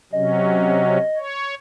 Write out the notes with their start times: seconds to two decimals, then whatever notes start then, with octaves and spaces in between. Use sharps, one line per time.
0.13 C3 F#3 C#4 D#5
1.17 C#5